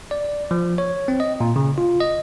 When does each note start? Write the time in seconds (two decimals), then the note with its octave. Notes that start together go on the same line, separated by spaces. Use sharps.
0.11 D5
0.51 F3
0.78 C#5
1.08 C4
1.20 D#5
1.40 A#2
1.56 C#3
1.78 F4
2.00 D#5